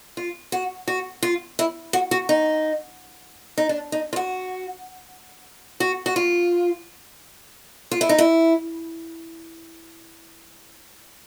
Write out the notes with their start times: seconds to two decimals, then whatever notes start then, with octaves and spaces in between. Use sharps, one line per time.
0.17 F4
0.52 F#4
0.88 F#4
1.23 F4
1.59 E4
1.93 F#4
2.11 F#4
2.29 D#4
3.58 D#4
3.69 D4
3.92 D#4
4.13 F4
4.16 F#4
5.80 F#4
6.06 F#4
6.16 F4
7.91 F4
8.01 E4
8.09 D#4
8.18 E4